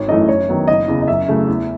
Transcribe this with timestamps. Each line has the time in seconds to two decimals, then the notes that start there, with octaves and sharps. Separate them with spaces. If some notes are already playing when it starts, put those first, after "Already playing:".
Already playing: G#1 C#5
0.08 F#2 E3 A3 D#5
0.28 F#2 C#5
0.48 D#3 F#3 B3
0.68 F#1 D#5
0.88 E2 C#3
1.02 D#5
1.08 F#2 E5
1.28 C#3 F#3 A3
1.48 E2